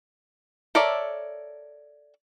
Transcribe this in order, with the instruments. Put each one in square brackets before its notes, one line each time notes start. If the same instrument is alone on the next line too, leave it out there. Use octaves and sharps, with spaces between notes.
[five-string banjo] A4 A#4 C#5 D5 E5